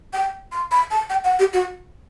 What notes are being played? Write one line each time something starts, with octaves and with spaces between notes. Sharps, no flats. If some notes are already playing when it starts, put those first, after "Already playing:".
G5
C6
B5
A5
G5
F#5
G4
F#4